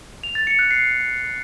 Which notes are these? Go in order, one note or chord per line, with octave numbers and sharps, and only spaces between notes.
F7
A6
C#7
F#6
C7